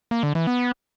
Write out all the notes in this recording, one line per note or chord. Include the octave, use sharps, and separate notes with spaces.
A#3
D3
E3
B3